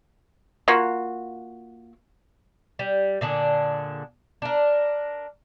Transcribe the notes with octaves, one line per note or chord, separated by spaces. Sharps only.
A#3 F4 F#4
G3
A#2 D3 D4 G#4
D4 A#4